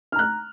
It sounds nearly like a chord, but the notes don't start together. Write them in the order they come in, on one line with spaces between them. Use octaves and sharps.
F6 A#5 F#6